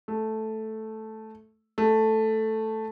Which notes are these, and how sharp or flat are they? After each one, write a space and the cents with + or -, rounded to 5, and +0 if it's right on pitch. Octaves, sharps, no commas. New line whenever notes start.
A3 -5
A3 +0